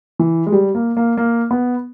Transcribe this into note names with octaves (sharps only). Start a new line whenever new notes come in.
E3
G#3
G3
A#3
A#3
A#3
B3